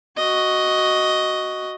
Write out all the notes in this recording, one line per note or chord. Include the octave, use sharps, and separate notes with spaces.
F#4 D#5